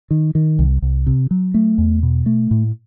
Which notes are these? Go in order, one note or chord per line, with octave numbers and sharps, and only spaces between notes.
D#3
D#3
C2
C2
C3
F#3
A3
E2
B2
A3
A2